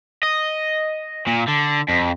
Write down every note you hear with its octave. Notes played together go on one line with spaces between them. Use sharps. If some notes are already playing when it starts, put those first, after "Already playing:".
D#5
A#2
D3
F2